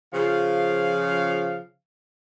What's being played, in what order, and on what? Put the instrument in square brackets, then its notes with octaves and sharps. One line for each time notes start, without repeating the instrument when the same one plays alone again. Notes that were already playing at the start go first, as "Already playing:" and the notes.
[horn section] C#3 F3 F5